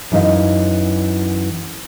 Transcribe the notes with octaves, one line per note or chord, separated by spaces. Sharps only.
F#2 E3 D#4 D#5 F5